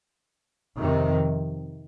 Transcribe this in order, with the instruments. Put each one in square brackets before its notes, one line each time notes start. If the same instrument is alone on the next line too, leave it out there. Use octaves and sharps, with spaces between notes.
[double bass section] F2 C3 D#3